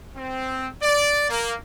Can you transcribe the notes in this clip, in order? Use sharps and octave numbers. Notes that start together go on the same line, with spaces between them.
C4
D5
A#3